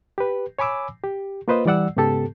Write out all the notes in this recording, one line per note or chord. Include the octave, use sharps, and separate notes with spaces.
G4 B4
C#5 G#5 B5 D6 E6
G4
A#3 F4 B4 C5 D#5
E3 G3 D5 F#5 E6
G#2 C#3 B3 G4 A4 A5